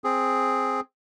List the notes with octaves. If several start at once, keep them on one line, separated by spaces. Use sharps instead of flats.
C4 G#4